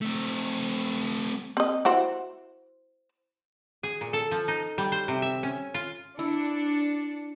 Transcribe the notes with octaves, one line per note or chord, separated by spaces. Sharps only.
A3 C4
C4 D#5
E4 F#4 C5
G#4
A#2
A4
F3
D#4
G3
C5
C3
E5
C#4
F4
D4 E4 C#7